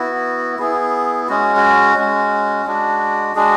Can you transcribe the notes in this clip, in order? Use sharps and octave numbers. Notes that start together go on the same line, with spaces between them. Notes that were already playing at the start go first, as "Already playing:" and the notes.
Already playing: B3 E4 F#4
B3 E4 G#4
G#3 C#4 F#4
F#4
G#3 C#4 F#4
G#3 D4 F#4
G#3 D4 F#4 G#4